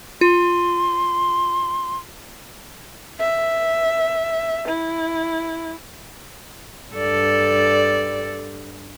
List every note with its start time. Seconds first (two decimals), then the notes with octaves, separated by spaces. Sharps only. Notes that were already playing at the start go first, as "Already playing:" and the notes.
0.21 F4 C6
3.19 E5
4.68 E4
6.93 G2 A4 D5